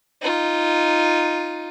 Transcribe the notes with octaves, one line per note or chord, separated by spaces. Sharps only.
D#4 F4